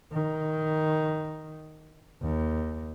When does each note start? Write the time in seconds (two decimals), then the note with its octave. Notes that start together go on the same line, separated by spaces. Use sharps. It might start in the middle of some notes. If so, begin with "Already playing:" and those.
0.12 D#3
2.22 D#2